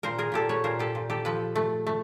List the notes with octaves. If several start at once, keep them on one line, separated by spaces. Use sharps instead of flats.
A#2 A#4 C5
G#4 A#4
A#2 G4 A4
B4 C#5
A#2 A#4 C5
G4 A4
A#2
G4 A4
F3 A4 B4
A3
A3